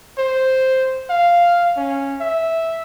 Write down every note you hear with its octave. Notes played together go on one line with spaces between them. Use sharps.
C5
F5
C#4
E5